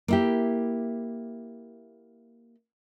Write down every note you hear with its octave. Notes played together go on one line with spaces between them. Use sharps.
A#3 E4 G4